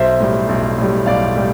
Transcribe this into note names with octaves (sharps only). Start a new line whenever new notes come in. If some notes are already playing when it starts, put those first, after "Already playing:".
Already playing: B1 C5 E5
A2 G3
B1
A2 G3
B1 D5 F5
A2 G3